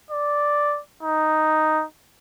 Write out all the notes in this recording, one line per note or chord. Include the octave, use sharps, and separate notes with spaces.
D5
D#4